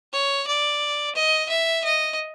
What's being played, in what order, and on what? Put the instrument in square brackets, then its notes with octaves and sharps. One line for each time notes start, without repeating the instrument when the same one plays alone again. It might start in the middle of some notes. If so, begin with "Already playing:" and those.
[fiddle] C#5
D5
D#5
E5
D#5